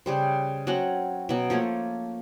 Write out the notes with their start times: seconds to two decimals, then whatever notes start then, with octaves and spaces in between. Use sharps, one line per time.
0.06 C#3 G3 C5
0.67 F#3 C4 C#4 F#5
1.29 B2 F#3
1.50 F3 A3 A#3 C#5